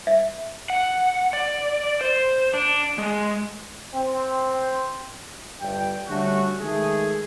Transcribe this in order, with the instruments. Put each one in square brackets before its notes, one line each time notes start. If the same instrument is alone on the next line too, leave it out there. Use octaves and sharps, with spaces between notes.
[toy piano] E5
[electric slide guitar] F#5
D5
C5
D4
G#3
[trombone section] C4
[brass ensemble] G1 G2 G5
D3 G3 A3 C#4 F#4
D#3 G#3 A3 G#4